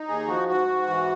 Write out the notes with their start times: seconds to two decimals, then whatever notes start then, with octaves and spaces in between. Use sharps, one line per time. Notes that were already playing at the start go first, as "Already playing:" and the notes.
Already playing: D#4
0.08 D#2 G#4
0.28 F3 F#4
0.48 G#2 F#4
0.68 G#2
0.88 E3